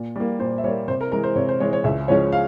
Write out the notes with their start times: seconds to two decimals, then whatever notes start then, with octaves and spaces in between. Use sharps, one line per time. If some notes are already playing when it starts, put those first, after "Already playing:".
Already playing: A#2
0.16 G3 A#3
0.39 A#2 C5
0.58 E5
0.64 G3 C#5
0.68 A#3
0.88 C3 C5
1.01 A#4
1.11 E3 G#3 A#4
1.24 C5
1.36 C3 C#5
1.49 C5
1.60 E3 G#3 C#5
1.73 C#5
1.84 C#2 E5
2.08 C#3 F3 G#3 C#4 C#5
2.32 F5